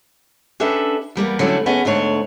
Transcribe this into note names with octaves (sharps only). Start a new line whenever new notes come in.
C#4 D4 G4 A4 B4 E5
E2 G3 A#3 B3
D3 F#3 G3 A3 C#4 E4
D#2 A3 B3 C#4 G#4 D#5
D2 G#2 A3 D4 C#5